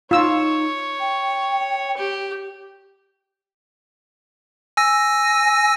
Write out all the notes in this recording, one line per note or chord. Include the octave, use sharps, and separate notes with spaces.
D#4 F4 C#5 E6
G5
G4
G#5 E6 A#6